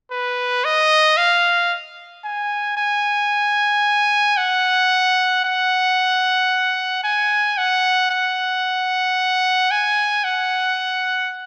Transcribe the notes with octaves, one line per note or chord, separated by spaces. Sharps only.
B4
D#5
F5
G#5
G#5
F#5
F#5
G#5
F#5
F#5
G#5
F#5